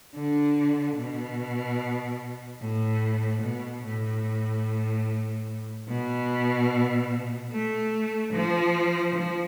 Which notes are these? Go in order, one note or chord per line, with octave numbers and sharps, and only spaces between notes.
D3
B2
A2
B2
A2
B2
A3
F3
F3